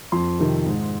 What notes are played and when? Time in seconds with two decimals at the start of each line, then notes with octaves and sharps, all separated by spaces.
0.12 F2 C6
0.39 C3 D#3
0.66 G#2